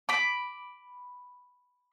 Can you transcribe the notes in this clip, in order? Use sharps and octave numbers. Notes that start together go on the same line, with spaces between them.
B5 D6